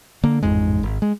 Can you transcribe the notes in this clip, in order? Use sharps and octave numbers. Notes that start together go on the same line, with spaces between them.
D3 A#3
A1 F2 G#2 G#3
G#1
G#3